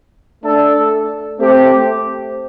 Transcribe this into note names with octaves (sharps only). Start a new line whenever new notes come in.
A3 D4 A4
A3 C4 G4